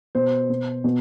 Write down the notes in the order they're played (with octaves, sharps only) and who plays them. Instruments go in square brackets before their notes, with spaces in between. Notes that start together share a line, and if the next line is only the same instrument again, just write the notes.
[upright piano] B2 C5
B2
B2